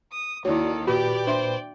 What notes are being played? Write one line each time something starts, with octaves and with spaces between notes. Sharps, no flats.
D#6
D#2 D#3 E4 F#4 A4 C#5 D5
A#2 F#4 G4 B4 D5 G5 B5
D4 C5 E5 C6